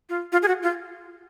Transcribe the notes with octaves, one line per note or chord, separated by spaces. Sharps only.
F4
F4
G#4
F#4
F4